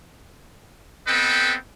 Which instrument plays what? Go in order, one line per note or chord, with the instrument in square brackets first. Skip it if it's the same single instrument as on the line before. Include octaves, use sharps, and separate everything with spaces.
[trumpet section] B3 C4 A4 B4 D#5 G5